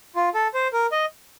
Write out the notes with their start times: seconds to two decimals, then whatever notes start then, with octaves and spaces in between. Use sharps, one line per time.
0.16 F4
0.34 A4
0.54 C5
0.73 A#4
0.92 D#5